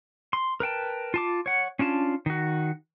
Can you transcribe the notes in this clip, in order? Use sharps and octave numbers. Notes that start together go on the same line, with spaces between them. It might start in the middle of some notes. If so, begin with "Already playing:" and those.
C6
A#4 B4 G5 A5
F4 A5 D6
C#5 F#5
C#4 D4 F4 A5
D#3 F#4